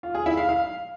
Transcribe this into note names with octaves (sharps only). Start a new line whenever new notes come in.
F4
G#4
E4
F5
F5